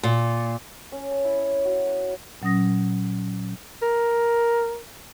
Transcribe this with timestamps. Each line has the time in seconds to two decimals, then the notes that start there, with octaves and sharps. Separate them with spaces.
0.03 A#2
0.92 C#4
1.12 A5
1.25 E4
1.39 C#5
1.65 F#4
1.87 B4
2.42 A#2 F#3 C#4 D#6 A#6
3.82 A#4